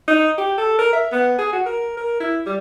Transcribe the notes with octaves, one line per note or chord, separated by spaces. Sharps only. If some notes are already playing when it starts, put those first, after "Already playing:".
D#4
G4
A4
A#4
E5
B3
G#4
F#4
A#4
A#4
E4
G3